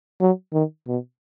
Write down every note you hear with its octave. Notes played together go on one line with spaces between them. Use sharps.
F#3
D#3
B2